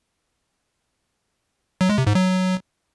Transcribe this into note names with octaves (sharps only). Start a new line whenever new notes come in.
F#3
G#3
C3
G#2
F#3